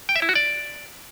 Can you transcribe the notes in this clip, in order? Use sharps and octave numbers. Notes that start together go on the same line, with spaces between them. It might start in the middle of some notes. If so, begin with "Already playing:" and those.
G5
E5
E4
F#4
D5